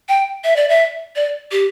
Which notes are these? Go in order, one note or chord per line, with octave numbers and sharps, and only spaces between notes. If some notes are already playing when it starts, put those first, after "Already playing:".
G5
E5
D5
E5
D5
G4